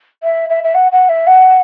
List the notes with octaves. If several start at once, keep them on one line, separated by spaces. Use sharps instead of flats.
E5
E5
E5
F#5
F#5
E5
F#5